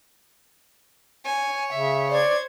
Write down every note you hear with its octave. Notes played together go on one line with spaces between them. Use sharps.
C#5 G#5
C#3 E5
C5 D5 G#6